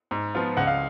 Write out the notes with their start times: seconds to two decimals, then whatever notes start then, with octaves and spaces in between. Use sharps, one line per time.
0.11 G#2
0.35 F3 B3 F4
0.57 C#2 F#5
0.67 F5